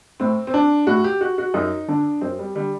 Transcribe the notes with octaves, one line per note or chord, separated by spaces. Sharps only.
A2 C4
C4
D4
A2 F#4
G4
F#4
F#4
F#2 D#4
D3 D4
F#2 C4
G3
D3 G3